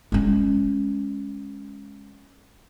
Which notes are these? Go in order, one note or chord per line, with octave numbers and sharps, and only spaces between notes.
G#3 C#4